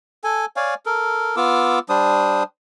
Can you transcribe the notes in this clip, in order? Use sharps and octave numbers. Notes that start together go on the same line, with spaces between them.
A4 G#5
C#5 D5 F5 G#5
A4 A#4
B3 F4 D6 E6
G3 D4 C5 D#6